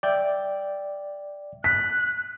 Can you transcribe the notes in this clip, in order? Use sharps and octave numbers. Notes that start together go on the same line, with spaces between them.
D5 E5 G5
F#6 B6